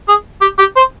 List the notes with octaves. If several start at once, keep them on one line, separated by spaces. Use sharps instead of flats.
G#4
G4
G4
C5